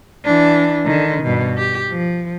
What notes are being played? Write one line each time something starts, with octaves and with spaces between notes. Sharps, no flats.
E3 D4
D3 D#3
G2 B2
G4
F3